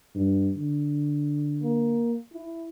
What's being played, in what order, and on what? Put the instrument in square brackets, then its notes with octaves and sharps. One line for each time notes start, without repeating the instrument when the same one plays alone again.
[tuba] G2
D3
[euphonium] A#3
E4